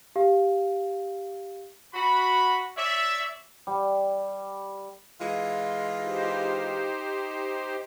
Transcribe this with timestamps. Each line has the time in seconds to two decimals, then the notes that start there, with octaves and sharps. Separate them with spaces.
0.16 G4 F5
1.94 F#4 B5
2.77 C#5 D5 E5
3.67 G3
5.20 E3 G#3 F4
6.02 D#4 G4 C5